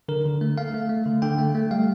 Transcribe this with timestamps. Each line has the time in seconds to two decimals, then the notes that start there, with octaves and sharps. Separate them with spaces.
0.09 D3 A#4
0.25 D3
0.41 A3
0.58 A3 F5
0.74 A3
0.90 A3
1.06 D3
1.22 D3 G5
1.38 A3
1.55 A3
1.71 G3 F5